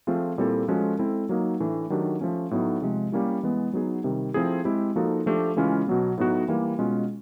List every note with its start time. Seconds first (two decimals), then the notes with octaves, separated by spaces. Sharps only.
0.07 F3 A3 C4 F4 G#4
0.38 A#2 G3 C4 E4 A4
0.68 F3 G#3 C#4 F#4 A4
0.99 G#3 C4 E4 A4
1.29 F#3 A#3 D#4
1.60 A2 E3 A3 D4
1.90 D#3 F#3 A3 D4 G4
2.21 F3 A3 C#4
2.51 A2 F#3 B3 D#4
2.82 C3 F3 G#3
3.12 G3 A#3 C#4 E4
3.43 E3 G#3 B3
3.73 F#3 B3 D#4 G#4
4.04 C3 D#3 G3
4.34 F3 A3 C4 E4 G#4
4.65 G#3 C4 E4 G4
4.96 F3 A#3 D#4 F#4 A4
5.26 F3 A3 D4 G4
5.56 C#3 E3 G#3 C#4 F4
5.87 B2 F#3 B3
6.18 A2 F#3 B3 D#4 F#4
6.48 E3 G3 A#3
6.79 B2 G#3 C#4 F4